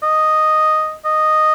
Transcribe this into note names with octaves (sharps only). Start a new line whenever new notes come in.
D#5
D#5